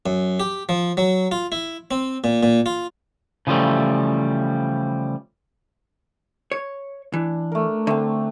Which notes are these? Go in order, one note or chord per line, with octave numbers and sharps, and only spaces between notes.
F#2
G4
F3
F#3
F4
E4
C4
A#2
A#2
F4
C#3 E3 F3 G3 A3
C#5
E3 D4
A3 A#4
D3 A3 C4